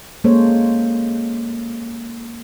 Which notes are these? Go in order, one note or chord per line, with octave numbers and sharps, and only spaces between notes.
G#3 A#3 C#4 A4 C5 C#5